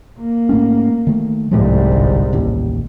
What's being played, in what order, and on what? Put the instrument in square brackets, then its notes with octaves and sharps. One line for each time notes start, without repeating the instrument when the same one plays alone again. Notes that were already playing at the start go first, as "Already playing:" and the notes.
[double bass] A#3
[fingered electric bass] G#2 A3 C#4
D#3 A3
[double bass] C2 G#2 [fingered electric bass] F3 G#3 A3
[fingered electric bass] G1
A1 D#2